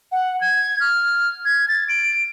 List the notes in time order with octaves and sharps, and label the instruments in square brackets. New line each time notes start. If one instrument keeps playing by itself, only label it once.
[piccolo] F#5
G#6
F6
G#6
A6
D7